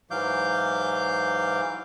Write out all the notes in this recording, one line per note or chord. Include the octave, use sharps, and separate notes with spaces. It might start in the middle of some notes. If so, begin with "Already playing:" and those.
G#2 E3 F#3 F5 D6 G6